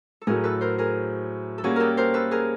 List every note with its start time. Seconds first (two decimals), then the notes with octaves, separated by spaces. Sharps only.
0.21 A4
0.27 A2 F#3 A3 G#4 A#4
0.44 A4 B4
0.61 A#4 C5
0.78 G#4 A#4
1.58 A4
1.63 G3 A#3 C#4 F#4 G#4
1.76 G4 A4 A#4
1.97 A#4 C5
2.14 A4 B4
2.31 G#4 A#4